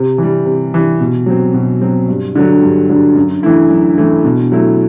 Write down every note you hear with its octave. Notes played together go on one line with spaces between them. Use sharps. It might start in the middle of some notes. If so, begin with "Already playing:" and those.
Already playing: C3
E3 G3
C3
E3 G3
B2
F#3 C4
B2
F#3 C4
G2
D3 F#3
G2
D3 F#3
F#2
E3 A3 E4
F#2
E3 A3 E4
B2
F#3 A3 E4